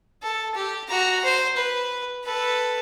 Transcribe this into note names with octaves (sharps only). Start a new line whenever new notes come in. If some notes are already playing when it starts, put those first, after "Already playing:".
A4
G4
F#4 A#5
C5
B4
A4 B4